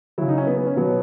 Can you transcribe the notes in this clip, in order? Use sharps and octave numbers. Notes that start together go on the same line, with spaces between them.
C#3 F#3 E4
D#4
C#4
B3
B3
C#4
B2 F#3 B3